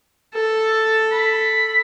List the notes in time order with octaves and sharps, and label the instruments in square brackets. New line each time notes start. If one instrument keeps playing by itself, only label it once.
[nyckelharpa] A4
[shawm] B5